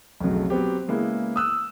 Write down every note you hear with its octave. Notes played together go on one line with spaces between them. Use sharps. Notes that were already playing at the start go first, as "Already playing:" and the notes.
B1 F2 C#3 F#3 A3
F#3 B3 C4 G4
C#3 G#3 A#3 B3 E4
D#6 E6 F#6